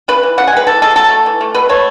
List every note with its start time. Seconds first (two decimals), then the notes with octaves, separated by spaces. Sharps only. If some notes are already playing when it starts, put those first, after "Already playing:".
0.08 C#3 B4
0.23 E3
0.38 C#3 F#5
0.47 G#5
0.52 G#3 B4
0.67 E3 A4
0.82 G#3 A4
0.96 F#3 A4
1.10 A3
1.26 E3
1.41 A3
1.54 B2 B4
1.69 A3 C#5